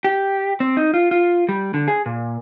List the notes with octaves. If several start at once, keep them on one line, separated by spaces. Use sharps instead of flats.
G4
C4
D#4
F4
F4
G3
D3
G#4
A#2